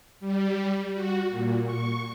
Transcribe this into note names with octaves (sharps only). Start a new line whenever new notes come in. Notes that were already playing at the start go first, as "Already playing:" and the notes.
G3
F#4
A#2
C#6